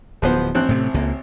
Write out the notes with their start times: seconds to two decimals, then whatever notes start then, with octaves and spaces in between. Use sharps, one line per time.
0.22 D1 F3 B3 C5
0.55 A1 C4 F#6
0.69 A2 C3
0.94 C#2 A#3